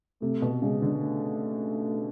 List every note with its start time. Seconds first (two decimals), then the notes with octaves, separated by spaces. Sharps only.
0.22 C3 A3
0.42 B2
0.62 C#3 G#3
0.82 D3
1.01 A3